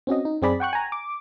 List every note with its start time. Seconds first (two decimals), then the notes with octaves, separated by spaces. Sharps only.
0.07 C4 C#4 F#4 D#5
0.25 D#4
0.42 F#2 C4 G#4 D5 B5
0.60 F#5 G5 C#6 F#6
0.73 G#5 A#5
0.92 D6